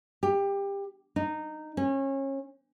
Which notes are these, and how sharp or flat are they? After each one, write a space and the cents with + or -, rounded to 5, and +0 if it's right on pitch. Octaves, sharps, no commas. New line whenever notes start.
G4 +20
D#4 -15
C#4 -30